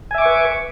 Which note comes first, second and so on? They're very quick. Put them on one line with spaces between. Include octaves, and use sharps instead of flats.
G#5 E5 D6 C#6 B4